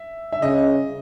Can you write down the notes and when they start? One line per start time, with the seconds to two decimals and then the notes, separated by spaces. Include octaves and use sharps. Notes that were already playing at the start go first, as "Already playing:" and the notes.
Already playing: E5
0.32 E5
0.42 C#3 D#5